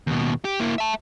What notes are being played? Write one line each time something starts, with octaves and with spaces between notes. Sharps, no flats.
D#2 B2
G4
A#3 E4
E5 A5